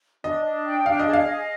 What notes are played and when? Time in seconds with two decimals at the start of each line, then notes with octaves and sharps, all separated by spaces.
0.24 D4 D#5
0.45 D4
0.66 G5
0.86 D4 F5
0.99 D#5
1.07 G#4
1.13 F5
1.26 D#5